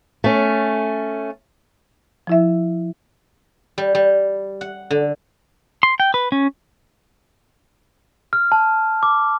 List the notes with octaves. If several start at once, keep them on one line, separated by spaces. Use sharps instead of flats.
A3 C#4
F3 E4 E5
G3
G3
F#5
D3
C6
G5
B4
C#4
F6
A5
D6